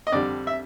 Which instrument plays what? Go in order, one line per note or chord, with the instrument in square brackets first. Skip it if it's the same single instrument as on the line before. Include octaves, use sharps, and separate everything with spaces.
[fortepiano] D#5
F2 D3 G3 D5
E5